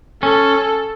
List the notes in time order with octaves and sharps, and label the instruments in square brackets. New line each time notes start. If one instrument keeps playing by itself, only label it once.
[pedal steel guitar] C#4 [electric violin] A4